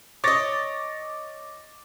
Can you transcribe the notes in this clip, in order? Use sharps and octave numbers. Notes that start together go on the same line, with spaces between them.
C#5 D#5 D6 A6 A#6